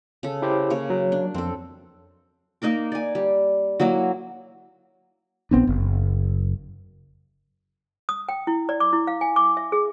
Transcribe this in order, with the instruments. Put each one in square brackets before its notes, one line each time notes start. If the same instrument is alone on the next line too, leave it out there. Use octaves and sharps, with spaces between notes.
[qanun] C#3 A4
[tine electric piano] E4 G4 C5
[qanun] C#3 A#3 C#5
[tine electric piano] F#3
[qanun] D4
[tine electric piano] F2 [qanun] C4 A4
[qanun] A#3 D#4 A#4 D6
D5 G#5
G3
F#3 A#3 E4 F#4
[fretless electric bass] A#1 B3 C4 D4
F#1
[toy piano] D#6
G5
E4
D5
D6
E4
F5
G#5
D6
E5
G#4